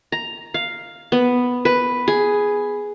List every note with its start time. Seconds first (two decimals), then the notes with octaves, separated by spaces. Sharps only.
0.12 A#5
0.54 F5
1.12 B3
1.65 B4
2.08 G#4